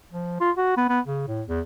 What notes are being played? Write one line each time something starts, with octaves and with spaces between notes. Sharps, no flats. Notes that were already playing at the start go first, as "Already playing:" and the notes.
F3
F4
F#4
B3
B3
C#3
A2
E2